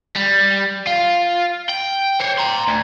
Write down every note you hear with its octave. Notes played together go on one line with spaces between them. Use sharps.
G3
F4
G5
C5 C#5
A#5 C6
D2